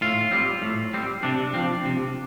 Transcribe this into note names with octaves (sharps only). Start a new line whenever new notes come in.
A2 F4
G3 C4
A2
G3 C4
C3 D4
F3 C4
C3